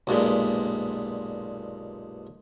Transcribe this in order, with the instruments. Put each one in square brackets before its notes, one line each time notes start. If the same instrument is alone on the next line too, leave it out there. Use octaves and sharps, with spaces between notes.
[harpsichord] B1 G2 A#2 G#3